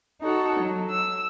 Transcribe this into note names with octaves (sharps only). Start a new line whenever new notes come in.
D#4 F#4 A4 C#5
F#3
E6